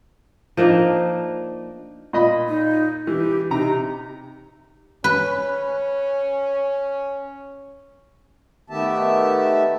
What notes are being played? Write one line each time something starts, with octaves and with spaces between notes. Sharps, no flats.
F3 A#3 D4 D#4
A#2 D#5 B5
D#4
E3 G4
C3 D#4 A#5
C#4 B4
D#3 A3 B3 G4 E5 A5